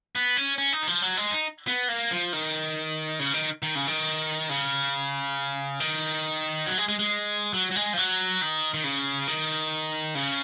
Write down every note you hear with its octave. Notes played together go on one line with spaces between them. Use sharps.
B3
C#4
C#4
D#4
D#3
F3
F#3
G#3
D#4
B3
A#3
F3
D#3
C#3
D#3
D#3
C#3
D#3
C#3
D#3
F#3
G#3
G#3
G#3
F#3
F#3
G#3
F3
F#3
D#3
D#3
C#3
D#3
C#3